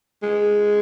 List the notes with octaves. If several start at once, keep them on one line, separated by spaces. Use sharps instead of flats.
G#3